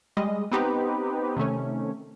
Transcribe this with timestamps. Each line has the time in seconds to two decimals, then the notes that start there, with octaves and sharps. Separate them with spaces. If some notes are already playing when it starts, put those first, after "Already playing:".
0.17 G3 G#3 D#5
0.51 B3 C4 D#4 G4 B4
1.36 C3 D#3 A3 C#4